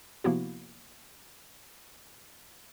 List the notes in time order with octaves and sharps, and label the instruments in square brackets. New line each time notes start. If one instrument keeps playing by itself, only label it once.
[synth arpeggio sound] C3 F3 A#3 B3 E4 F#4